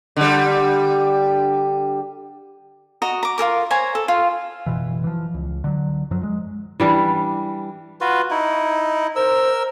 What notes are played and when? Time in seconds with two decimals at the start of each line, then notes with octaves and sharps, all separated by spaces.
0.17 D3 G3
3.02 F#4 D#5 A#5 D#6
3.23 A#5 D6
3.38 F4 A4 A#4 D6
3.71 C5 C#5 G#5 A#5
3.95 A4
4.08 F4
4.66 F#1 B2 E3
5.04 E3 F3
5.34 C#2
5.64 D3 F#3
6.11 F#2 F3 F#3
6.23 G#3
6.80 E3 G3 D4
8.01 F4 F#4 B4
8.31 D#4 E4
9.16 A#4 C5 E6